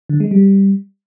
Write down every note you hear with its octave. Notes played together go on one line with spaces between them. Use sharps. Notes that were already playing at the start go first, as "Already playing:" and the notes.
D3
G#3
G3